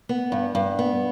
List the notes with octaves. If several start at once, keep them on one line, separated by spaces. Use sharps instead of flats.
B3
G2
G2
B3